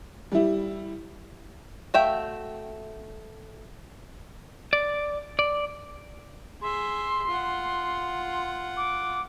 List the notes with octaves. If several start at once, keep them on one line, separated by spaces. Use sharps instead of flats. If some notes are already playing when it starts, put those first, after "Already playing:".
G3 E4
A3 F#4 E5 F5 G5
D5
D5
G#4 E5 C6
F4 F#5
D6